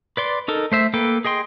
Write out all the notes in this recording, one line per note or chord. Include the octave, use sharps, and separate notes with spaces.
B4 D5 C6
D#4 A4 A#4
A3 C5 E5
A#3 A4 B4 G5
G#4 D#5 G5 C6